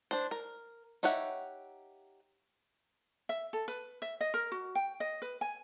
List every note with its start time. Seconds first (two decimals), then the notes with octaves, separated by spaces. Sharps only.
0.11 D4 C5
0.31 A#4
1.03 D#4 G4 C#5 E5 F#5
3.29 E5
3.53 A4
3.68 B4
4.02 E5
4.21 D#5
4.34 A#4
4.52 F#4
4.75 G5
5.00 D#5
5.22 B4
5.41 G#5